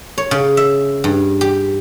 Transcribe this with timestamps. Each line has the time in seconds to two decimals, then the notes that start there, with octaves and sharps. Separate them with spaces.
0.18 C#5
0.31 C#3
0.57 E5
1.04 G2
1.41 G4